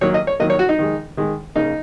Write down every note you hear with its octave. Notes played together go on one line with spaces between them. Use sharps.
D#3 F#3 A#3 C#5
D#5
C#5
D#3 F#3 A#3 D#5
C#5
F#4
D#4
D#3 G#3
D#3 G#3
C#3 A#3 D#4